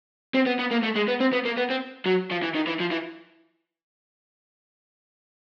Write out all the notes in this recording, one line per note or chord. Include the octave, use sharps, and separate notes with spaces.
C4
B3
B3
A#3
A3
G#3
B3
C4
B3
A#3
B3
C4
F#3
F3
E3
D#3
E3
F3
E3